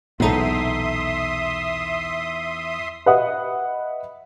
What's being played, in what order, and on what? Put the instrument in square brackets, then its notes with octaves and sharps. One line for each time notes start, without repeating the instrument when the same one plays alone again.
[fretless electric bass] B1 A#2 [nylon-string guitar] E2 D#4 A4 [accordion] E5 C6 D#6
[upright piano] B4 D#5 E5 F#5 B5 D#6